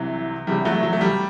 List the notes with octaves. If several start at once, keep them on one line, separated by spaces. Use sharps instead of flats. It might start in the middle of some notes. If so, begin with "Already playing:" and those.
Already playing: C2 C3 E3 F#3
E1 E2 C3 E3 G3
F#3 A3
F#3
A3
G3